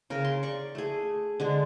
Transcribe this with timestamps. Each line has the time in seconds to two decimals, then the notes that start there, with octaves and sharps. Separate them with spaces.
0.10 C#3 A#4
0.25 C6
0.43 D5 C#6
0.75 A3 G#4
1.40 D3 G#3 D4